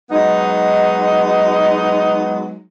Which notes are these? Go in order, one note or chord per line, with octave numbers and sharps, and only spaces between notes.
F#3 G#3 B3 D#4